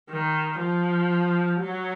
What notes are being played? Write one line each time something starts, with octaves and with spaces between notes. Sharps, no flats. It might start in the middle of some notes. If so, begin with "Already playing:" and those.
D#3
F3
F#3